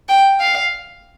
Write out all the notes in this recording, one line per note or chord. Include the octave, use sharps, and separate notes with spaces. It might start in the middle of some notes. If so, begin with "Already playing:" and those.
G5
F5